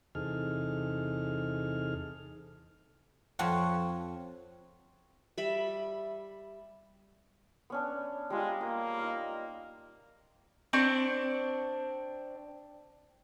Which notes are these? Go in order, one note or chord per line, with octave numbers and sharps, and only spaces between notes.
E2 C3 D#4 G#4 A4 F6
F2 F3 C4 C#5 F#5
G3 E5 B5
B3 C#4 D4
G3 G#3 F4
A#3 D#6
D#4 D#5 F5
C4 D4 C#6